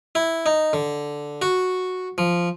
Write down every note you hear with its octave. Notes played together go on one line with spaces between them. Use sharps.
E4
D#4
D3
F#4
F3